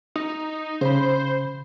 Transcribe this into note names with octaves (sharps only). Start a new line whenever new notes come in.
D#4
C#3 C5 B5